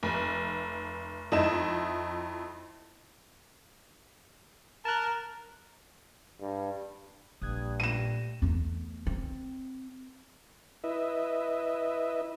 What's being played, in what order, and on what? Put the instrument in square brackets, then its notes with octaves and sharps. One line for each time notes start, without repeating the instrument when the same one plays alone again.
[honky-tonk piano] F1
F2 D#4 E4 E7
[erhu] A#4 [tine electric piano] A5 F#6
[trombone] G2
[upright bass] A#1 [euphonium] G2 [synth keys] D#6 F#6 G#6
[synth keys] A#2 A3 A#6 [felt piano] D#7 E7
[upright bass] E2 A3
C4
[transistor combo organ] E4 B4 D#5 E5